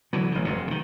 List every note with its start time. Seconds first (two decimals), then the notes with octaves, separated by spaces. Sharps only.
0.13 D3 E3 F#3
0.32 A1 D#3
0.45 F1 F#2 C3
0.68 D3 D#3